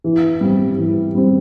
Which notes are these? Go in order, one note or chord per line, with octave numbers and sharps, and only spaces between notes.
E3
G3 C4
E3
G3 C4